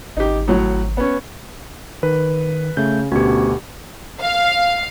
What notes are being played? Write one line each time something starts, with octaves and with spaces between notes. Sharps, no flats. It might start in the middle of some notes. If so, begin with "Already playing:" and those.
G#1 D#4 G4
A2 F#3
B3 C#4
D#3 B4
C#3 A3 G6
D2 B2 C#4 F#4 G4
F5